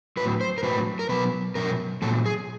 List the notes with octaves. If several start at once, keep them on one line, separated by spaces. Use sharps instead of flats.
A2 F#3 B4
C5
A#4
A2 F#3 B4
A#4
B2 F#3 B4
B2 F#3 A#4
A#2 F#3 A4
G#4